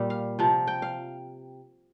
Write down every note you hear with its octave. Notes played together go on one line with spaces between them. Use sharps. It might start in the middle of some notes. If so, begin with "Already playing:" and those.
Already playing: A#2 G3
F5
C3 F3
G5
F5